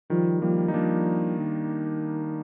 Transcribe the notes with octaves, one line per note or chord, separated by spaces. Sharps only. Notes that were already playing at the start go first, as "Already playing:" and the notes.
D#3 F3 G3
F3 G3 A#3
D#4
F3 A#3 D4
D#3